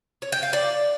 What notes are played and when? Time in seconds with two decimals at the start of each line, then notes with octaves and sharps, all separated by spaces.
0.22 C#5
0.32 G5
0.43 F5
0.53 D5